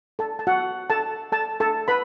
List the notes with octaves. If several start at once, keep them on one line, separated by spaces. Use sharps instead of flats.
A4 A5
A5
F#4 F#5
A4 A5
A4 A5
A4 A5
B4 B5